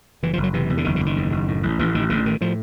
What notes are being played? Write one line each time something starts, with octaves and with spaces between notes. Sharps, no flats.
F#1 E3
F3
F#1
F#3
C3 E3
E2
D3
F#1 D#3
D3
F#1
D#3
E2
F#1
A2
A1
A1 E3
A1 D#3
A1 D3
A2 D#3
A2 F3